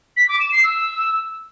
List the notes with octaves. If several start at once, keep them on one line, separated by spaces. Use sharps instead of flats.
B6
D6
E7
C7
E6